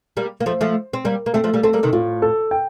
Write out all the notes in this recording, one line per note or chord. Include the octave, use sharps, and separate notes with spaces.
G3 A#3
A#3
F3 A3 C5
F3 A3
C4
G3 A#3 A#4
A#3
A3 C4 A4
F3 A3
G3 A#3
A3 C4 A4
G3 A#3
C3 D#3
A2 F4
A4
G5